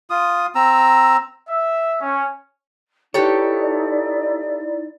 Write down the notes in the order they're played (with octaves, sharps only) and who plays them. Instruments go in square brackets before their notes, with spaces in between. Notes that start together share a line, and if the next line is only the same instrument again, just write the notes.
[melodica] F4 D#6
C4 A#5 E6
[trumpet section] E5
C#4
[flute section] D#4 E4 D5 [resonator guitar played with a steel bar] G4 A4 [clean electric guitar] B4 C#5